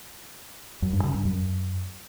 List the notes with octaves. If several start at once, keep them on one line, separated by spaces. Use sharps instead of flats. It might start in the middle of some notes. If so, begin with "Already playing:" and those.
F#2
G2
C#3
G2
F#2